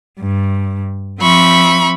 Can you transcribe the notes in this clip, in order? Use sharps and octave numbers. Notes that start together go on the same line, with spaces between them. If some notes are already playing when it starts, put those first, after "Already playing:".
G2
F3 C4 E5 B5 C#6